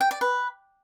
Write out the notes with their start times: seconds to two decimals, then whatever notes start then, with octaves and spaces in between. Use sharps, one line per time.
0.01 G5
0.11 D5
0.21 B4